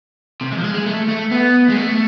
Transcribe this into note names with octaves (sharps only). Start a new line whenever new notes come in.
C3
G#3
F3
G#3
G#3
A3
A3
B3
G#3
A3